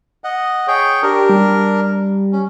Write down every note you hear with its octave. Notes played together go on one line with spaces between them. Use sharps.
D#5 F#5
G#4 C#5 G5
D4 G4 A#4
G3
C#4